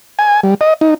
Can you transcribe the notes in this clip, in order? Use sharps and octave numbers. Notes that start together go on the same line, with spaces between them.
G#5
G3
D#5
D#4